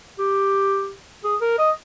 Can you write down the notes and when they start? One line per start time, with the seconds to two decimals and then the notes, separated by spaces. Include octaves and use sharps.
0.19 G4
1.24 G#4
1.41 A#4
1.58 D#5